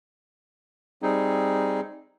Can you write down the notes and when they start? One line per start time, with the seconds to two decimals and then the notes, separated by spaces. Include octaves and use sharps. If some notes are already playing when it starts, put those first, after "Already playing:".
1.03 G3 C4 D#4 G#4